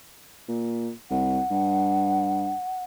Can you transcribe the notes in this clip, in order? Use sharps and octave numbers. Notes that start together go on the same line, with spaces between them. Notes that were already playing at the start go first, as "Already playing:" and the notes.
A#2
C2 F#5
G2